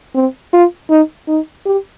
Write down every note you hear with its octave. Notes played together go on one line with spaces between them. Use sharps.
C4
F4
D#4
D#4
G4